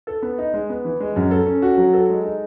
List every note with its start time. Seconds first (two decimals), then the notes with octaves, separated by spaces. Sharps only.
0.07 A4
0.22 B3
0.38 D#4
0.54 G#3
0.70 B3
0.85 E3
1.00 G#3
1.16 F#2
1.31 A4
1.46 C#4
1.62 F#4
1.78 F#3
1.93 A4
2.10 G#3
2.24 D#4